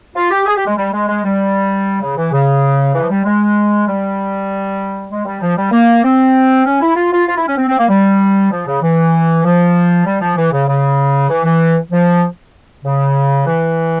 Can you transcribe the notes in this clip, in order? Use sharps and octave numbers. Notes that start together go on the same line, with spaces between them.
F4
G4
G#4
G4
G#3
G3
G#3
G#3
G3
C#3
E3
C#3
E3
F3
G3
G#3
G3
G#3
G3
F3
G3
A#3
C4
C#4
E4
F4
F4
F4
E4
C#4
C4
C4
A#3
G3
F3
C#3
E3
F3
G3
F3
E3
C#3
C#3
E3
E3
F3
C#3
E3